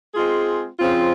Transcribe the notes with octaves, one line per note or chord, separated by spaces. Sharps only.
G#3 C4 F4 G#4
C#3 F3 C4 F4